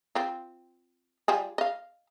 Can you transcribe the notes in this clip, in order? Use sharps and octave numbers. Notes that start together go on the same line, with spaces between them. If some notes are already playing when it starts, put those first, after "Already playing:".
C4 F4
G3 F4 G#4
D#5 F5